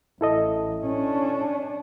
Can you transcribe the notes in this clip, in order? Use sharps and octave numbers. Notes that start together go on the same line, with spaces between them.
A1 E4 A4 D#5
C#4 D4